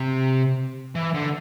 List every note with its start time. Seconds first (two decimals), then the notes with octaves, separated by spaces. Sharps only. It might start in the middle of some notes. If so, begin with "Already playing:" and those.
Already playing: C3
0.95 E3
1.14 D3